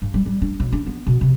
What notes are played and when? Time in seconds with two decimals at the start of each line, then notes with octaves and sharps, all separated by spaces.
0.02 G2
0.14 G3
0.26 G3
0.42 D4
0.60 B1
0.72 D4
0.87 B3
1.07 B2
1.21 C3